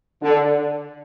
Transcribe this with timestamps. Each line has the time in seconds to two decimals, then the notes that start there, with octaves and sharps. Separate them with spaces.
0.22 D3